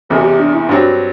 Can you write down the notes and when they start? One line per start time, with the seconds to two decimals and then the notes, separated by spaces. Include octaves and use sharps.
0.09 F#1 E2 C3 A4
0.19 F#4
0.24 G4
0.40 D4
0.54 E4
0.69 G2 F#3 C4 D4